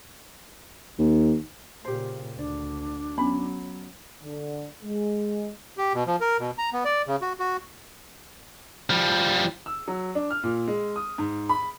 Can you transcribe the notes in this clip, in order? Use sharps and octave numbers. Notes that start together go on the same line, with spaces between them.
D#2
A#2 C#3 G4 C5
D2 D4 D5
F#3 B3 C#4 B5
D3
G#3
G4
B2
F3
A#4
B2
A#5
B3
D5
C#3
F#4
F#4
F3 G3
E6
F#3
D4
F6
A#2
G#3
D#6
G#2
B5